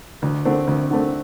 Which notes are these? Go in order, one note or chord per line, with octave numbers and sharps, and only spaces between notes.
D2
D3 A3 C4
D2
D3 A3 C4